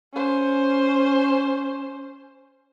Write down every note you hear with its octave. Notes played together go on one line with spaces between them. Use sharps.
C#4 C5